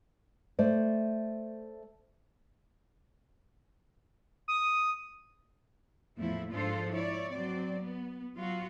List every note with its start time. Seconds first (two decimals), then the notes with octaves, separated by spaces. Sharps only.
0.59 A3 C5 D5
4.48 D#6
6.17 E2 A2 F3 A3 E4
6.51 G#2 F3 D4 F4 A4 C5
6.91 E4 C#5 D5
7.32 F#3 C4 D5
7.81 B3
8.38 F#3 F4 F#4